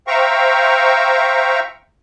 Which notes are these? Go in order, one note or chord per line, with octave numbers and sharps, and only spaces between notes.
C5 E5 F5 G5 A#5 C#6